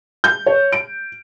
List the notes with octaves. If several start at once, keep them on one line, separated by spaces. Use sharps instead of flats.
G6
C#5
D7